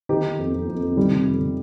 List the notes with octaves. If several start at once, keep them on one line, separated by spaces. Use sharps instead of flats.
D#3 D#4 G4
D#3
F2
F2
F2
F2
D#3 G3
C3
F2
C3